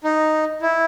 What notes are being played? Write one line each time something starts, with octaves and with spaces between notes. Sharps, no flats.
D#4
E4